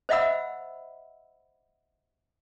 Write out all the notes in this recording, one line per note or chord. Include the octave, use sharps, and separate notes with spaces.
C5 D#5 E5 F#5 B5 E6